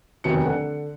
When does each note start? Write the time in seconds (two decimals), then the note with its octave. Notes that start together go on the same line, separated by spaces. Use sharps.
0.24 F1 D#2 B2 C#7
0.44 D3 F#5